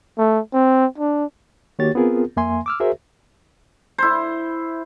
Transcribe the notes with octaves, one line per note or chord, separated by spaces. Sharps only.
A3
C4
D4
D#3 A#3 F#4 G4 C#5 A6
B3 C4 F4 G#4 A#4
F2 A#3 E5 G#5 C6
D6 E6 F6
F#4 G#4 A#4 C5 E5
E4 C5